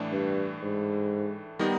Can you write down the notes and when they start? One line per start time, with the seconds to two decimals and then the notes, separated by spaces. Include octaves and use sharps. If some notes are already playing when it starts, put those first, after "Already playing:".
Already playing: A2 E3 A3 D4
0.12 G2
0.62 G#2
1.59 D#3 G3 B3 D#4